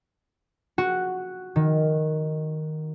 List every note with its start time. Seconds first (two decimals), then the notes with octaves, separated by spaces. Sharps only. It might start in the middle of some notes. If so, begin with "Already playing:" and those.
0.78 F#4
1.56 D#3